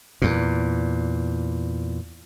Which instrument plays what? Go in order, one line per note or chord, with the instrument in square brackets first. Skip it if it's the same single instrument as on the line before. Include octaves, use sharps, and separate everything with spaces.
[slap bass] E2 A#2